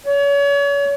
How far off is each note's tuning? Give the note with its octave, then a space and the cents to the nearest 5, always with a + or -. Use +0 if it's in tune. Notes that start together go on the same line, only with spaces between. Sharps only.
C#5 +35